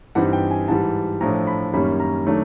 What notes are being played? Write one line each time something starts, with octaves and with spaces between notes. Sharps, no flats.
G2 E3 G3 C4 D#4 F#5
G5
G#5
G#2 E3 G3 A5
A2 F3 A3 D4 A#5
B5
F#2 D#3 G3 A#3 C#4 B5
A#5
D#3 F#3 A3 D4